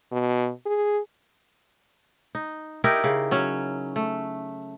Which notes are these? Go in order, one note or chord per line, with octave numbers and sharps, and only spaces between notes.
B2
G#4
D#4
D#4 E4 G4 A#4
C#3
F#3 C#4
A3